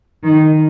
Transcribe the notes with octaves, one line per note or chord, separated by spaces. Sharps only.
D#3